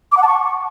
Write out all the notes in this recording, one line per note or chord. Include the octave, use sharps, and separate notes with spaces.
D6
F#5
A5
C#6